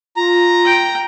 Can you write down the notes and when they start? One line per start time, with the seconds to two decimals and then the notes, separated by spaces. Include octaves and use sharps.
0.16 F4 A#5
0.65 G5